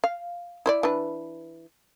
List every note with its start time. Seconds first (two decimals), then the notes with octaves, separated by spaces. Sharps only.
0.04 F5
0.66 E4 C5 D5
0.83 E3 D4 B4